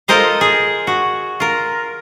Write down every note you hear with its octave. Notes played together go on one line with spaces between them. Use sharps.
F4 A4 A#4 C5 D#5 F5
G#4
F#4
F4 A#4